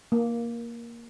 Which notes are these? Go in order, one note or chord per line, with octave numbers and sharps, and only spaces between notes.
A#3